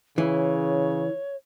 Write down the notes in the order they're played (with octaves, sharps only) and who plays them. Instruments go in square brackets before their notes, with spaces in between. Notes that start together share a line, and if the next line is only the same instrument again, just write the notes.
[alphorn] C#3 [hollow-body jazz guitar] E3 [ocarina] C#5